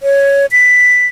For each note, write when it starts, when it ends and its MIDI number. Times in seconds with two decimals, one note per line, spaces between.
0.03 0.46 73
0.52 1.06 95